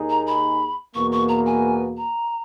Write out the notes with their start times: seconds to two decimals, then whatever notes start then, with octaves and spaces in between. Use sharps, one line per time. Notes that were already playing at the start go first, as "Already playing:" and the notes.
Already playing: D#2 D#3 A#3 D#4 G#4
0.10 A#5
0.27 B5
0.95 E2 B2 A#3 C#6
1.12 C#6
1.29 A#5
1.46 G#5
1.97 A#5